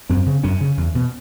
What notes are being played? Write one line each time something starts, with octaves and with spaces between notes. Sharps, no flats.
F#2 C4
C#3
F#2 C#4
C#3
E2
B2